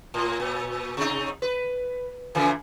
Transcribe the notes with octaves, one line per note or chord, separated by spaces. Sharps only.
A2
A#2
C3 D#4
B4
A#2 C#3 E3